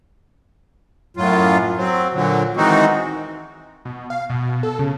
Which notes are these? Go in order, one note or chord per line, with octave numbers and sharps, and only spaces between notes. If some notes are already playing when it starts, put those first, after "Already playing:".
F#2 A2 F#3 F4
F#3 C4
A#2 D3 F#3
D#3 E3 G#3 C4 D#4 F#4
B2
F5
B2
A4
C#3